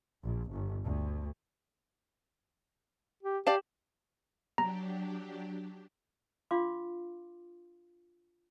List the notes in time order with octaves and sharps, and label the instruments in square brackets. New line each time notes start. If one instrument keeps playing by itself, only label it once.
[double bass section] A#1
G1
D2
[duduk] G4
[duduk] G4 [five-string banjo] D5 F5 A5
[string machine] F#3 D4 G4 [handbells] A#5
[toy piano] D4 F4 F5 C6 D6